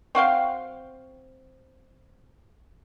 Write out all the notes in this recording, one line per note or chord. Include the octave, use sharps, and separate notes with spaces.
C4 F#4 F5 G5